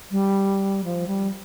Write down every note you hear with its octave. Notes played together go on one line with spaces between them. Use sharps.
G3
F3
G3